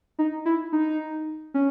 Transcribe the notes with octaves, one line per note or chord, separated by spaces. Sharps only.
D#4
E4
D#4
C#4